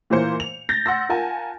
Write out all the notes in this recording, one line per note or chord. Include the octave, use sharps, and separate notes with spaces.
A#2 E3 A#3 C5 C#7
F7
G6 A6 A#6
F#5 C6 E6 A#6
F4 A#4 F#5 G#5 A5